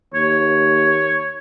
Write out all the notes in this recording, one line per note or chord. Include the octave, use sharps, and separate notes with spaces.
D#2 C#5